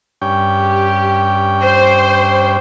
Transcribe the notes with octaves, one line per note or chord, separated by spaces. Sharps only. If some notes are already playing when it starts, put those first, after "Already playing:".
G2 C#4 G5
G4
C5